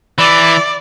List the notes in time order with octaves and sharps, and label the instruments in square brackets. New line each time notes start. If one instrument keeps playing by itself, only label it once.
[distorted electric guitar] E3 [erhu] D5